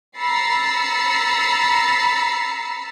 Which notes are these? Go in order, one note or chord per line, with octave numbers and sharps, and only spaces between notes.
A#5 B5 E6 A6 C7 C#7